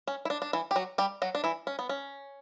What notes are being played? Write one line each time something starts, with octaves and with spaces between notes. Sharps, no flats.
C#4
E4
D4
D4
E3 E4
G4
F#3 F#4
G3 G4
F#3 F#4
D4
E3 E4
C#4
B3
C#4